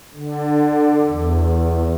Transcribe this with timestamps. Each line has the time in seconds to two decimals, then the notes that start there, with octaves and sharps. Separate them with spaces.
0.14 D3
1.07 E2